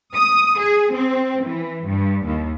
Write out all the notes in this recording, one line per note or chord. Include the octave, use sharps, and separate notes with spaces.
D#6
G#4
C4
E3
G2
D#2